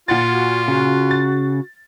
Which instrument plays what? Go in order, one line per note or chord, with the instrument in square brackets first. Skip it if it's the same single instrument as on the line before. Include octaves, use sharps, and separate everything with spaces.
[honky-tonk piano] A#2 F#5 A6 [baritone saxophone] F4
[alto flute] F#4
[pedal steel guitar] C#3 [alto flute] F#4
[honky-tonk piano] A6